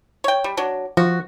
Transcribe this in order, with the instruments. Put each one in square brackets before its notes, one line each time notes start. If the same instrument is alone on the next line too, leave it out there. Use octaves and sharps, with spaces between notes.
[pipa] C#5 G5
G3
F#3 D4
[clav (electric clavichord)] F3 [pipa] F#4